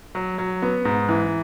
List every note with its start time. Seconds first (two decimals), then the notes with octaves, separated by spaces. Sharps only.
0.15 F#3
0.38 F#3
0.62 B3
0.85 G#2
1.09 E3